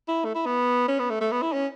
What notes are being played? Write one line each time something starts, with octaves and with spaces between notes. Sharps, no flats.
E4
A3
E4
B3
C#4
B3
A3
A3
B3
E4
C#4